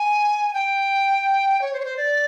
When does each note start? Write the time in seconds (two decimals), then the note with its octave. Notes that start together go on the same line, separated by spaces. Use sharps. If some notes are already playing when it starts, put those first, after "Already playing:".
Already playing: G#5
0.54 G5
1.62 C#5
1.73 C5
1.80 C#5
1.85 C5
1.97 D5